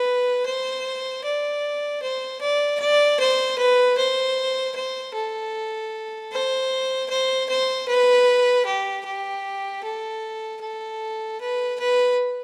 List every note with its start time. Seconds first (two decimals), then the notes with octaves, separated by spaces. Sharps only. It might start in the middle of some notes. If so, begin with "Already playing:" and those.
Already playing: B4
0.45 C5
1.24 D5
2.02 C5
2.41 D5
2.79 D5
3.19 C5
3.58 B4
3.97 C5
4.76 C5
5.14 A4
6.32 C5
7.10 C5
7.49 C5
7.88 B4
8.66 G4
9.05 G4
9.84 A4
10.62 A4
11.40 B4
11.79 B4